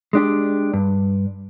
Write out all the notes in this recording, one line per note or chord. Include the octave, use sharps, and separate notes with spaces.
G#3 D4 G4
G2